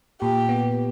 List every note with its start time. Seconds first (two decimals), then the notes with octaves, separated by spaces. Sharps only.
0.21 A#2 G4
0.49 B3